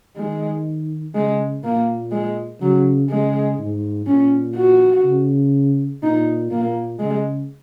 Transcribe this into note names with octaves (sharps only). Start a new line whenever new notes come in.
D#3 G#3
C#3 G#3
A#2 A#3
G#3
C#3 F#3
C#3 G#3
G#2
A#2 C#4
F#4
C#3
A#2 D#4
A#2 A#3
C#3 G#3